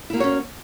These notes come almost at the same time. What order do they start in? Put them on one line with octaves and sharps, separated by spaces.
E4 A#3 F#4 C#5 C#4